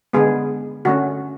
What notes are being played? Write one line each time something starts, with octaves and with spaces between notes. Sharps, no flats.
D3 G#3 B3 G#4
D3 A3 C#4 F#4